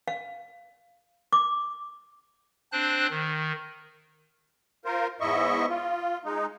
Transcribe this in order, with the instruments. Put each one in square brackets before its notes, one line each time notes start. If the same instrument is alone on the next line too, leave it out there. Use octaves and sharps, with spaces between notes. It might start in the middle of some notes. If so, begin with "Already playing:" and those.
[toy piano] F5
D6
[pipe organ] C4 D4 C5 F#6
D#3
[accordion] F4 A#4 C5
E2 G#2 E4 D#5 E5 C#6
F4
G#3 D#4